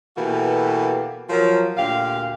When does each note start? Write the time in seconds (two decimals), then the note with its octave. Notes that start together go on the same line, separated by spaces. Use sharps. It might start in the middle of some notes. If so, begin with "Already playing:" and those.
0.17 B2 E3 A#3 F#4 G4 A4
1.30 F3 F#3 A#4
1.76 D2 A#2 G4 F5